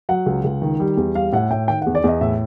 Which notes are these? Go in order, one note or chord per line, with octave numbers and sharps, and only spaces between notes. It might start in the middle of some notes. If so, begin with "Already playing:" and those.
F#3 F#5
C#2
C#2
D#3
G3
E2
G3 F5
A2 F#5
A2 G5
D#3 G5
F#5
E2
D5
E2 D#5
A2 E5